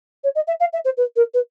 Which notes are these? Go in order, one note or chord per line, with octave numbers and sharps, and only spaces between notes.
C#5
D#5
E5
F5
E5
C5
B4
A#4
B4